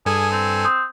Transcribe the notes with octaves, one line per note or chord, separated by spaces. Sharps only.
G2 G#4 A4 G#5
C4
C6 D#6 G6